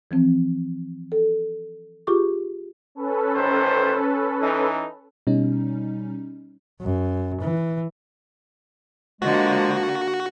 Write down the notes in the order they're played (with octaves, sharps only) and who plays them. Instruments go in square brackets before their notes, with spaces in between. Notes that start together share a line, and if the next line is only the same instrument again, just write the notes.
[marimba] E3 F3 C4
A4
F4 G4 G#4 C#6 D6
[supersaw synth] C#4 A4 B4
[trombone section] A1 D#3 C5
E3 D#4
[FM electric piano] B2 G3 C#4 D#4
[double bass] F#2
E3
[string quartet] D3 A#3 [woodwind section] F3 G#3 [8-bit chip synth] F#4